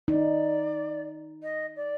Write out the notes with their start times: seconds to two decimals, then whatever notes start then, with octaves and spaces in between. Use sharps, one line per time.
0.08 D#4 D5
1.43 D#5
1.76 D5